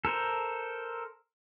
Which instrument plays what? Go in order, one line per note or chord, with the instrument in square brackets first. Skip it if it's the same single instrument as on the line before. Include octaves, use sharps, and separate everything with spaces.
[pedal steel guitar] A4 A#4 C5